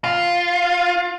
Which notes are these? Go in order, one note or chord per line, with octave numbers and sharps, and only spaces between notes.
F4